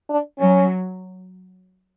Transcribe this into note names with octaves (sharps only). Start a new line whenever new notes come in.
D4
F#3 C#4